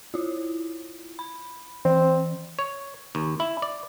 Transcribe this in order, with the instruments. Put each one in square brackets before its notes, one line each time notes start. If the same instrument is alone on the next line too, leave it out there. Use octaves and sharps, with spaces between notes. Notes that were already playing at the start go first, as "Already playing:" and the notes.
[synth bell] E4 F4
B5
[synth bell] E3 [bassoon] C4
[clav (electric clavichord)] C#5
D#2
E4
D5